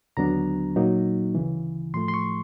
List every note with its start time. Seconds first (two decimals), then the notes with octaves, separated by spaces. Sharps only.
0.17 D#2 D3 F#3 B3 D4 A#5
0.76 A#2 F#3 A#3 D#4
1.35 D2 C#3 E3
1.94 A2 F3 A3 C6
2.08 C6
2.14 C#6